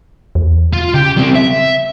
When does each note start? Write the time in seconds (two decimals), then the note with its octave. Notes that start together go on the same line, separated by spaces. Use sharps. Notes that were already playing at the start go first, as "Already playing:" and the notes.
0.35 E2
0.73 F4
0.94 C#3 G4
1.17 G3 C4
1.35 E5